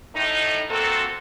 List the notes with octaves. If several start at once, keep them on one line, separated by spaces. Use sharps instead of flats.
A2 D#4
A#2 A#3 C4 F#4 A4